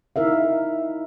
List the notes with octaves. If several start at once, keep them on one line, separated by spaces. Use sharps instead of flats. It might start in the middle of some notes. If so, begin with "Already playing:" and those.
D#4 E4 A#4 E5 F5